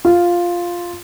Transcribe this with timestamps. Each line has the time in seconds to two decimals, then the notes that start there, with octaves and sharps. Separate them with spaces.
0.05 F4